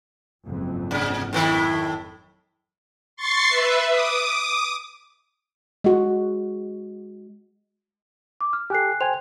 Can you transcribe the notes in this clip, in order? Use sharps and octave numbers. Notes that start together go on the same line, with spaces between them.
F#1 F2 G#2
C3
A2 D#3 E4
C6 C#6 A6 C7
B4 E5
D6 D#6
G#3 F#4
D6
F6
G4 A4 G#5 F#6 C7
C5 G5 G#5 F7